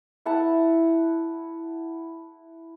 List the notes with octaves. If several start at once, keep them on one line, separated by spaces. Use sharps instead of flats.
E4 F#5 A5